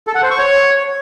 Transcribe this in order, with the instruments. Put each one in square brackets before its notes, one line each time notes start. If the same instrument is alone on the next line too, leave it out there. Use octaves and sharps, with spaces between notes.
[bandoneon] A4
F#5
C5
C#6
C#5